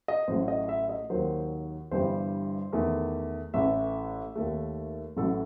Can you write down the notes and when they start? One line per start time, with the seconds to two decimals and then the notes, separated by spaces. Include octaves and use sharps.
0.08 D#5
0.28 A1 A2 F#3 A3 C5
0.48 D#5
0.69 E5
0.89 D#5
1.10 D#2 D#3 F#3 C5
1.91 G1 G2 E3 G3 C5
2.73 E2 D#3 A3
3.54 A1 A2 E3 A3 E5
4.35 D#2 D#3 A3
5.17 A1 A2 F#3 A4